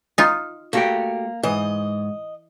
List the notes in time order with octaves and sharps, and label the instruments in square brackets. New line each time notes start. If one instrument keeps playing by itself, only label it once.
[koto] D#4 F4
[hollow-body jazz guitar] A3 F#4 G4 [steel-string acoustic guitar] A#3
[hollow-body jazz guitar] G#2 [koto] E3 [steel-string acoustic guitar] D#5